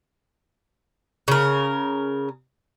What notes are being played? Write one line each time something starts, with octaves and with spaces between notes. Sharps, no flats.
C#3 A#4